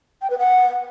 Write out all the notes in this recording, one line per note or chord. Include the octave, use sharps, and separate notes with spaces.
G5
B4
F#5